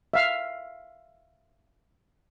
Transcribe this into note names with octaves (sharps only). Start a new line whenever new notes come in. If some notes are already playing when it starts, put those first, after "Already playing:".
E5 F5